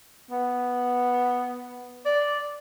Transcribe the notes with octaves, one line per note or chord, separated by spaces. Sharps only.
B3
D5